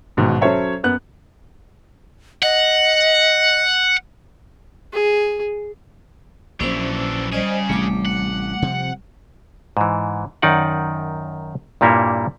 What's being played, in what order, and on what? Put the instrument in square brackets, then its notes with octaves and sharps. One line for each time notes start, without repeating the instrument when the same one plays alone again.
[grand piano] A1 G#2 B2 D#3
F#3 C#4 A4 C5 C#5 E5
F#2 B3 F#6
[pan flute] D#5 [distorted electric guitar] F#5
[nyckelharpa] G#4
[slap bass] A#1 A#2 F#3 [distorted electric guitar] E3 D4 [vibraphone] C#4 C5
[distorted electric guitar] C#3 G#4 [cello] G3 [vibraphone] C5 D5 D#5
[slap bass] A1 C3 [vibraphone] A3 D6
[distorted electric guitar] F#5
[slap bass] C3 F3 C4
[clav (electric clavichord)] G#2 E3
F#2 D#3 D#4 D5 F#5
G2 A#2 G3 A#3 E4 C#5